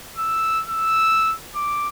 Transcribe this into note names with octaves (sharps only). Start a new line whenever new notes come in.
E6
E6
D6